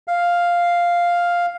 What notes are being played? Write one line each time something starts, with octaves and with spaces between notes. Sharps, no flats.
F5